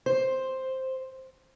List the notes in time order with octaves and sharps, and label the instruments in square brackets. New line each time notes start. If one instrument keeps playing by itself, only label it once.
[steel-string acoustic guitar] C5